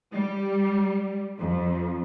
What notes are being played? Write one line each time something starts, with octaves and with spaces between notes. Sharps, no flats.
G3
F2